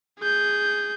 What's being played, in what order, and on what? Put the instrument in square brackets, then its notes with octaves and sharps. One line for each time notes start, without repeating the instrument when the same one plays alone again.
[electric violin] G#4 G6